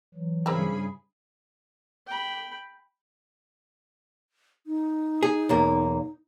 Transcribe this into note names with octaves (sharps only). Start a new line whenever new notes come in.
E3 F#3
G2 C#3 C4 E4 G#4 A#4 B5
G5 B5
D#4
G#4
B1 E2 A#3